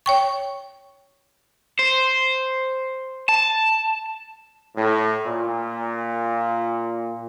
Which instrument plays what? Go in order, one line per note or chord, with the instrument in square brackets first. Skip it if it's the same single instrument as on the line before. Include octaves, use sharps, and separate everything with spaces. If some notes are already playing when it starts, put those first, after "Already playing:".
[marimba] C#5 G5 C#6
[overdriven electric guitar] C5
A5
[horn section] A2
A#2